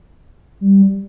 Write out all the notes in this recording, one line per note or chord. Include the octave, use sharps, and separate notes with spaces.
G3